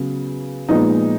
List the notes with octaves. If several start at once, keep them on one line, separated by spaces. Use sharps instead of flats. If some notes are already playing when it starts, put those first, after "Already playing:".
Already playing: C#3 F#3 B3
A#2 F3 G#3 B3 D#4